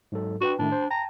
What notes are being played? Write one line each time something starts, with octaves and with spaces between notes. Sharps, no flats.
G#2 F#3 A4
D4 F#4 B4 G5
A2 D#3 A3 D4
C5
G5 A5 A#5